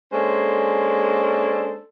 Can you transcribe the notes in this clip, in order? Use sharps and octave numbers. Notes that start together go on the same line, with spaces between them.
G#3 A#3 C#4 D4 A4 C5